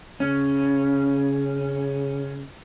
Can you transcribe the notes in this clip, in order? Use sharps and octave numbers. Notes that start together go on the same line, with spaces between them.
C#3 C#4